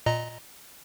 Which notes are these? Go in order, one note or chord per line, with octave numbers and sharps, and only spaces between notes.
A#2 D#5 A#5